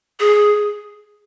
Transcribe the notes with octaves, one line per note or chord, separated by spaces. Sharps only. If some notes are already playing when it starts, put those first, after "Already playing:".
G#4